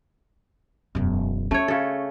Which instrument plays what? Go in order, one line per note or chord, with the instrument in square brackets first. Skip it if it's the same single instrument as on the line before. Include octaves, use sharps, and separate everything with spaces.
[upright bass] E1 F#2
[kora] A3 C#5 [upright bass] C#4
[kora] C#3 A4